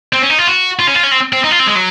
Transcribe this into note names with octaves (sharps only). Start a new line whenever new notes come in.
C4
C#4
D#4
F4
F#4
F4
C#4
F4
C#4
C4
C4
D#4
F4
C4
G#3
F#3